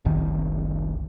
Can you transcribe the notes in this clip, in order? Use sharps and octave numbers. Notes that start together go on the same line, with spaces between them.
F#1 C2 D#3